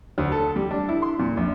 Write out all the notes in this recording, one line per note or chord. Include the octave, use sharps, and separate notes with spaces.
D2
A4
G3
D4
E4
C6
A#2
A#1